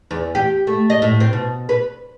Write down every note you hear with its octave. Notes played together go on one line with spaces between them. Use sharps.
E2
G4
A3
D#5
A2
C4
B2
B4